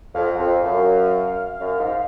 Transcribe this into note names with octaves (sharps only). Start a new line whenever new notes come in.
F2 F5
F#5
F2 F5
F#2
F#2
G#2